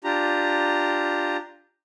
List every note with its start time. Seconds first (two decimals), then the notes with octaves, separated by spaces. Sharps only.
0.04 D4 F4 G4 A#5